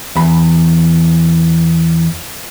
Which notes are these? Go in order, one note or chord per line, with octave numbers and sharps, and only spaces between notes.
E2 B5